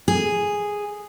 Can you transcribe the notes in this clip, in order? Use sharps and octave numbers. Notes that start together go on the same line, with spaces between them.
G#4